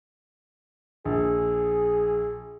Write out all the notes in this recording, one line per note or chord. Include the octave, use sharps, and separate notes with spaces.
A#1 G#4